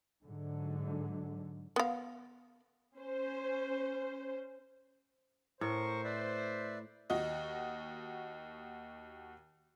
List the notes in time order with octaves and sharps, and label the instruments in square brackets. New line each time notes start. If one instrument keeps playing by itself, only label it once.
[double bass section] G#2 D3 F#3
[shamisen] B3 F5
[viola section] C#4 C5
[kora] A2 [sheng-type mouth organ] A#4 C#6 [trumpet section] C5
[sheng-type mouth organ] B4 D5 E5
[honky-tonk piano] D#2 F#4 D#5